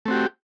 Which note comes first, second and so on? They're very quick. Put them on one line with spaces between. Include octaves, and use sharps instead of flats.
A3 C4 F#4 G4